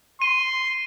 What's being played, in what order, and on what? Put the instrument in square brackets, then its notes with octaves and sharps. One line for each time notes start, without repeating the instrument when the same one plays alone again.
[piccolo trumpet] C6 [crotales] D#7